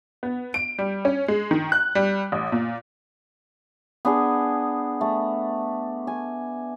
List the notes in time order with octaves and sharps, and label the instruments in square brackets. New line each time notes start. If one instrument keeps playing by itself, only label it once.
[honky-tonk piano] B3
D7
G3
C#4
G#3
D#3
F#6
G3
A1
A#2
[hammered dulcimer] B3 D4 G#4
A3
G#5